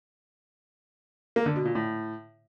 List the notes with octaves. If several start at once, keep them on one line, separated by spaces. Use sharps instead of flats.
A#3
D3
B2
A#2
A2